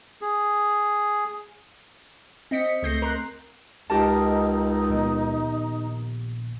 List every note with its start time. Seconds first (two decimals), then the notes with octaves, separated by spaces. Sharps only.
0.22 G#4
2.51 C4 D#5 B6 C#7
2.83 C#2 A3 G6 A#6 C7
3.02 A#4 C6 F#6
3.90 C#2 D#4 G4 A#4 A5
4.89 A#1 D#3 B3